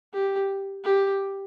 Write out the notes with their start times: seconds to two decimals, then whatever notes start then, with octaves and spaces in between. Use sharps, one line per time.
0.13 G4
0.84 G4